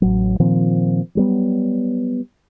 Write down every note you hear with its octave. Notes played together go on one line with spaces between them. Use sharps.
A1 F#3
A#2 D#3 F3 C4
F#3 G3 B3